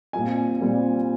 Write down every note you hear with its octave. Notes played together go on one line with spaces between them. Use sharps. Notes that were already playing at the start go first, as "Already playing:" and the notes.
A#2 G3 C4 G#5
A#2 G3 C4